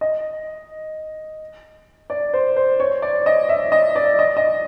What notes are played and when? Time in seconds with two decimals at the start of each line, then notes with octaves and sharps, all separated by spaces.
0.01 D#5
2.10 D5
2.33 C5
2.56 C5
2.80 C#5
3.02 D5
3.26 D#5
3.49 E5
3.72 D#5
3.96 D5
4.19 D#5
4.37 D#5